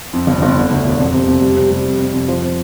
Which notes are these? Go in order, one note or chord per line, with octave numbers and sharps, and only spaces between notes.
F2
G1
G1
D3
D2
E1
F2
C3
F2
G3
C3
G3
F2
C3
F2
F3
F3